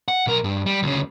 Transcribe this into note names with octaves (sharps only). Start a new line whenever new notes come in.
F#5
B1 A#4
G2
G3
D2 C#3